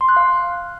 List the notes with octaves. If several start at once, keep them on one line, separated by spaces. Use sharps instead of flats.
C6
F#6
F5